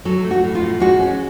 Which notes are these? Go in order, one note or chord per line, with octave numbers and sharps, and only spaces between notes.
F#3 A4
A3
F#4
A2
F4
A2
G#3 F#4
C#4